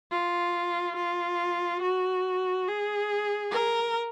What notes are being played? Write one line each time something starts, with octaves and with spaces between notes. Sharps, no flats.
F4
F4
F#4
G#4
A#4